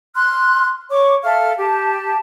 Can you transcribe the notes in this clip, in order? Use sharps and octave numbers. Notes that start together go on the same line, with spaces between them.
C6 F6 F#6
C#5 C#6 D6
A4 E5 F5 F6
G4 A5